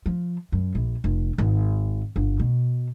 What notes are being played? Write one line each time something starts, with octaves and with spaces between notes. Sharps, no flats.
F3
F#2
A#1
F1
G#1
G1
B2